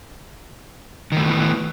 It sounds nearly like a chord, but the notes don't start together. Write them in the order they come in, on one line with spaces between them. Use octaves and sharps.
D#3 A3 E3 B3